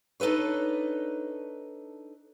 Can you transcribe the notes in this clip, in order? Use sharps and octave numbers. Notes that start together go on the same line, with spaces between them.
D4 D#4 A4 B4 C#5